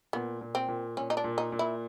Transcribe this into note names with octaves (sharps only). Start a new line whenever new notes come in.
A#2 B3
A#2
C4
A#2
A#2 C#4
D#4
D4
A#2
D#4
A#2
E4